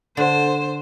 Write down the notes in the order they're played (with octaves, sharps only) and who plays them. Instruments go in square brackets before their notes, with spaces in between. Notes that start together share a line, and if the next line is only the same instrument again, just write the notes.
[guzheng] D3 [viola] C5